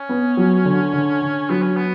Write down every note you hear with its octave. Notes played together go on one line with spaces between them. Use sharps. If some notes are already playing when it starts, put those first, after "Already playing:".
Already playing: C#4
B3
F#3
D3
D3
D3
F#3 B3
C#4
B3